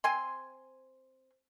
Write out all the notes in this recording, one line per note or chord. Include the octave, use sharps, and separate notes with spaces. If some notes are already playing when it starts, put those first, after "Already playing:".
C4 G#5 C6